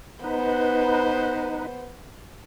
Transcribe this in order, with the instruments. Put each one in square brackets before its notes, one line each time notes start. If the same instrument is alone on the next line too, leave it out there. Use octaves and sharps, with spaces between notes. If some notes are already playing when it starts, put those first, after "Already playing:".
[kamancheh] B3 C5 [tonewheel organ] D#4 B4